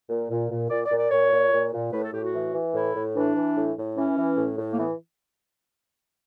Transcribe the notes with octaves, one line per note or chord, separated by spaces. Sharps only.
A#2
A#2
A#2
A#2 D5
D5
A#2
D5
A#2 C#5
A#2
A#2
A#2
A2 B4
A4
A2 G4
F#4
E3
E3
A2 E4
A2
E3 D4
E3
A2
A2
E3 C#4
E3
A2
A2
A#3
E3 B3